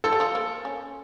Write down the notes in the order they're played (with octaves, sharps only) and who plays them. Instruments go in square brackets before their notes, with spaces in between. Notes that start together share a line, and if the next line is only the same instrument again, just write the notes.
[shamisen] F3 [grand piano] A4
[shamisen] G3
F3
A#3
C#4